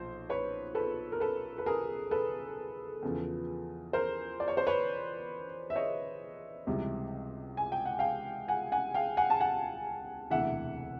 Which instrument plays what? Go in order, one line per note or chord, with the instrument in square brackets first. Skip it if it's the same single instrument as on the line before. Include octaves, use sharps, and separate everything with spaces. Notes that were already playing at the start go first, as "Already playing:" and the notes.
Already playing: [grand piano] B1 A#2 F3 C5
B4 C#5
A4 B4
A#4
A4 B4
B4
G#4 A#4
A4 B4
E2 C#3 F3
A#4 C5
D5
C#5
C5
B4 C#5
E5
C#5 D#5
C#2 C3 E3 G3
G#5
G5
F#5
F5 G5
F#5 G#5
F#5 G#5
F5 G5
F#5 G#5
A5
F#5 G#5
E1 D2 C3 E3 E5 F#5